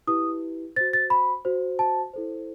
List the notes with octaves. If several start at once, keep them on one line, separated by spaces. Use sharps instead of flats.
E4 G4 B4 D#6
F#4 C5 A6
A6
B5
F#4 C5
A5
E4 A4 C5